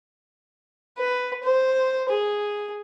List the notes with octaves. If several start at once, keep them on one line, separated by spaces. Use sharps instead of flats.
B4
C5
G#4